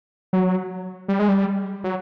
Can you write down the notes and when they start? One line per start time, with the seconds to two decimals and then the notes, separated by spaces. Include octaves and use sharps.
0.33 F#3
1.08 G3
1.19 G#3
1.29 G3
1.84 F#3